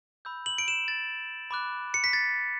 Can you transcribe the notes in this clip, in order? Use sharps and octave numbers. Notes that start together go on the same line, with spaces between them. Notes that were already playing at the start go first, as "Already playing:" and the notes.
B5 E6 G6
F#7
D7
E7
A6
B5 D6 F#6
C#7
B6
A6